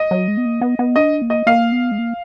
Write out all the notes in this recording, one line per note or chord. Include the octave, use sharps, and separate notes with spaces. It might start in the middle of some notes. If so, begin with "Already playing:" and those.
Already playing: D#5
F#3
G#3
B3
A#3
B3
B3
D4 D#5
A#3
D#5
A#3 F5
B3
G#3
A#3